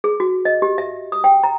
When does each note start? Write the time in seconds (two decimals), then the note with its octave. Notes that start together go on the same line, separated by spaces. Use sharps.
0.04 G#4
0.20 F#4
0.45 D#5
0.62 G4
0.78 E5
1.12 D#6
1.24 G5
1.43 A#5